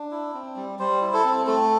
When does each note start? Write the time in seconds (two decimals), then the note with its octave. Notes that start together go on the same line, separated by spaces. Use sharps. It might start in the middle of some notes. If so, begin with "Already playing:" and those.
Already playing: D4
0.11 E4
0.34 C4
0.56 G3
0.79 G3 C5
1.02 E4
1.14 A4
1.25 C4
1.47 A3 A4